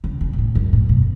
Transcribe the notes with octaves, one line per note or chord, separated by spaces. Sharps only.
C#3
C#3
B2
A2
F#2
A2
B2